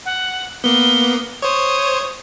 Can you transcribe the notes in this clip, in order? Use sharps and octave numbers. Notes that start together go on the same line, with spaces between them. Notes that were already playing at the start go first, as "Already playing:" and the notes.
F#5
A#3 B3 G7
C5 C#5 D#6